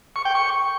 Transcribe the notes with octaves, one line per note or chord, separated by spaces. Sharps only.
C#6
G5
C#6